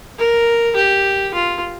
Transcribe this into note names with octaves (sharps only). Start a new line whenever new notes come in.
A#4
G4
F4